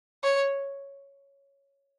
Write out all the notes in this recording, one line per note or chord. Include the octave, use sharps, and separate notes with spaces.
C#5